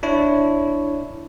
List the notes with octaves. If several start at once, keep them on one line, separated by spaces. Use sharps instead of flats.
D4 E4 C#5